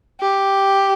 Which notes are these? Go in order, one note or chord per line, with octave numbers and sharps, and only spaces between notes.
G4